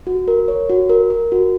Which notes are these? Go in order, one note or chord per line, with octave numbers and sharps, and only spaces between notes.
F#4
A#4
C#5
F#4
A#4
A#4
F#4